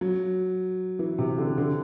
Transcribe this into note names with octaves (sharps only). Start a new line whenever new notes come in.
F#3
E3
C3
D3
D3